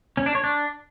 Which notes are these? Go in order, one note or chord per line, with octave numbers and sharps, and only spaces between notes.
C#4
D4
C#5
D4